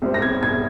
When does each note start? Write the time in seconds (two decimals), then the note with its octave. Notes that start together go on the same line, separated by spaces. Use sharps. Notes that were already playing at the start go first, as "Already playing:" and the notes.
0.02 C2 C3 G3 C4
0.14 A#6
0.22 G#6
0.43 G#6